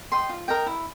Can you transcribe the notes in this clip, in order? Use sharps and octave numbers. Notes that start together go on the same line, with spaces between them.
D#5 G5 C6
F4
A#4 D#5 G5
E4